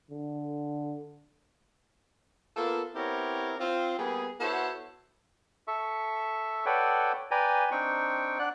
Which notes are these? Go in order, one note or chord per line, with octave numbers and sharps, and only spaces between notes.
D3
A#3 B3 F4 A4
B3 C4 E4 G4 A#4 C#5
C4 F4
G3 A#3 B3 G#4
B3 E4 F#4 A4 C5 C#5
A4 E5 C#6
A4 B4 C#5 D5 F#5 G5
B4 D5 G5 G#5 A#5
C4 D4 D#4 G5 C#6
D4 D5 F#5 F#6